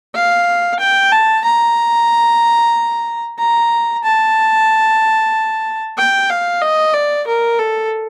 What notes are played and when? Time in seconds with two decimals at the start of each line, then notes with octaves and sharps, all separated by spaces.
0.15 F5
0.79 G5
1.12 A5
1.45 A#5
3.38 A#5
4.04 A5
5.98 G5
6.30 F5
6.61 D#5
6.94 D5
7.27 A#4
7.58 A4